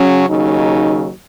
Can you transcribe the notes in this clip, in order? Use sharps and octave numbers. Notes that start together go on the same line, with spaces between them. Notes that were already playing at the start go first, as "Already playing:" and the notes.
Already playing: C#3 F#3 C#4
D#2 C#3 F#3 D#4